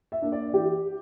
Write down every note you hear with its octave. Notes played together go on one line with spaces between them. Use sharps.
E5
A#3 D4
D5
E3 G4